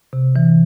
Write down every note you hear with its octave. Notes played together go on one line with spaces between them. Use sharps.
C3
E3